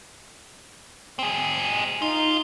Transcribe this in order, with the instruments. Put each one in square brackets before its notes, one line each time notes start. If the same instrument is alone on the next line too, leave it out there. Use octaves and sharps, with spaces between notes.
[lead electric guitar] C4 G#4
[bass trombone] D#4 [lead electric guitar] F4